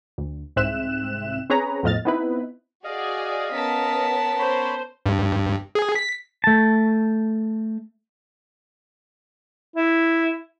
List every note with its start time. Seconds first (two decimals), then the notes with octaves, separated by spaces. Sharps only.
0.18 D2
0.56 C2 G#2 C4 E5 F#6 E7
1.50 C4 C#4 G#4 B4 C#5 A#5
1.83 E2 A2 F3 D#5 F6 A6
2.05 B3 C4 D#4 E4 B4
2.84 F#4 G#4 D5 D#5 F5
3.54 B3 C#4 A#4 A5 B6
4.39 C5 C#5 B5
5.06 G2
5.75 G#4
5.95 B6
6.44 A3 A5
9.76 E4